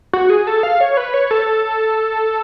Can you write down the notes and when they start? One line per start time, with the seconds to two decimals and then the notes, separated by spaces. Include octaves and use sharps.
0.13 F#4
0.30 G#4
0.47 A4
0.63 F5
0.81 C#5
0.97 B4
1.14 C#5
1.31 A4